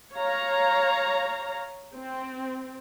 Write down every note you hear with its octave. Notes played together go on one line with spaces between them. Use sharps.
C#5 F5 A#5
C4